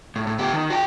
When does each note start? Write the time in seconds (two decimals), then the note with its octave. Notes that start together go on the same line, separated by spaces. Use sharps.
0.16 A2
0.27 A2
0.39 B3 G4
0.53 D#3
0.70 F#4 G5